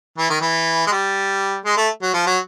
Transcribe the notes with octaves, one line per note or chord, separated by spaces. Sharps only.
E3
D#3
E3
G#3
G3
G#3
A3
F#3
F3
F#3